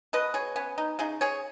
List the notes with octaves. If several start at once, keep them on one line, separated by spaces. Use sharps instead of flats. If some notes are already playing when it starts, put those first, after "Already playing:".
B2 B4 D#5
G#4 C#5
B3 C#4
D#4
C#3 D#4 G#4
G#4 C#5